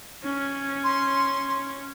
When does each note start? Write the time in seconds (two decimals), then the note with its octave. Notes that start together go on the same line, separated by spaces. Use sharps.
0.24 C#4
0.84 C6